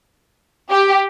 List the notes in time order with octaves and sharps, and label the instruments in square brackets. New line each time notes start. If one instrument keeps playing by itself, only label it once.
[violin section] G4